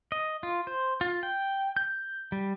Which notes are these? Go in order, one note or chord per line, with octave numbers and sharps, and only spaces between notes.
D#5
F4
C5
F4
G5
G6
G3